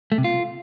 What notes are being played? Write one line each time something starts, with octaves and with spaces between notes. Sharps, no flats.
A3
C3
F4